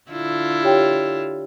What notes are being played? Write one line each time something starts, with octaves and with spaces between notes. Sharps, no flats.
D3 E4 F4
G4 C#5 G5